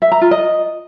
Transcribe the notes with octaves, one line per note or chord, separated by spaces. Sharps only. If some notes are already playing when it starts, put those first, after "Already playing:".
E5
A#5
F4
D#5